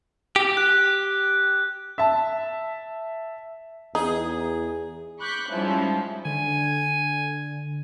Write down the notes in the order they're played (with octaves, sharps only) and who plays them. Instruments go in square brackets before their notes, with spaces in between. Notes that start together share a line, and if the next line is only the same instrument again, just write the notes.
[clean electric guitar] G4
[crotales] F#6
[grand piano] E5 A5
[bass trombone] E2 [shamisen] D#4 [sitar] G#4
[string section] B5 C#6 D6 F#6 G6 B6
G#2 F3 G3 C#4 E4
[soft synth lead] D3 [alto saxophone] G#5